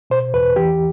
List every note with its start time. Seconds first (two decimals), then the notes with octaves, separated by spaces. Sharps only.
0.10 B2 C5
0.34 E2 B4
0.56 E3 G4